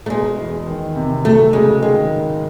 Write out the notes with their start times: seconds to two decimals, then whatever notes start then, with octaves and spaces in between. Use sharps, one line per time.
0.06 A3
0.10 B2 G#3
0.39 E2
0.67 D#3
0.96 C3
1.25 F#3 A3
1.53 C#3 G#3
1.82 D#3 G#3
2.11 G#2